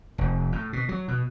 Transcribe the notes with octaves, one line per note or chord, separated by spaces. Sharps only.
F1
A2
B2
F#3
B2